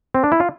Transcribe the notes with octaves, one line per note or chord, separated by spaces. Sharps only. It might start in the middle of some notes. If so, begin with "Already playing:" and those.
C4
D4
E4
F4